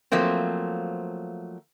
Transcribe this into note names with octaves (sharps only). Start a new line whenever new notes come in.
F3 F#3 A3 A#3 C4